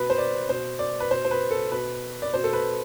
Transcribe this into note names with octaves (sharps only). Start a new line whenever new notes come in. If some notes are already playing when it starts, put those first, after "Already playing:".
Already playing: B2 B4
C5
D5
B2 C5
D5
B4
B2 C5
C5
B4
A4
B2 B4
D5
B2 C5
A4
B4